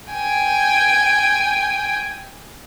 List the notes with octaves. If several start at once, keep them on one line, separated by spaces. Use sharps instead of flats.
G5 G#5